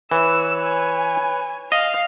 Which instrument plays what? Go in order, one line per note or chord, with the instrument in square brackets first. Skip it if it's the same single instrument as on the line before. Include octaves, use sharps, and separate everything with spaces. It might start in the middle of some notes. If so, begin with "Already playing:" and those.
[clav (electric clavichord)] E3 [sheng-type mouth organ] B4 C#5 [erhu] E6
[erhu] G#5
[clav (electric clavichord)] D#5 [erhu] F5